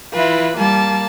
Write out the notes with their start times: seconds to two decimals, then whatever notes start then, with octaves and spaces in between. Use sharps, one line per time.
0.13 E3 E4 F4 B4
0.56 G3 A#3 A5